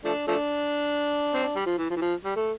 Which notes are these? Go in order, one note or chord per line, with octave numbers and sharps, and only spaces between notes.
F3 A3 D4
F3 A3 D4
C4
D4
G3
F3
E3
F3
E3
F3
G3
A3